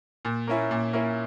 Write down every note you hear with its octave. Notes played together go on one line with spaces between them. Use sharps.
A#2
A#3 C#4 E4
A#2
A#3 C#4 E4